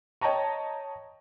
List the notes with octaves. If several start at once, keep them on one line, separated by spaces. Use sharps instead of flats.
C#5 D#5 G5 A5 A#5 C#6